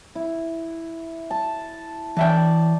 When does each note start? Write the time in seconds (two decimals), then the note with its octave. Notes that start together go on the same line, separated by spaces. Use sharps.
0.15 E4
1.31 A5
2.17 E3 D5 E5 G5 A5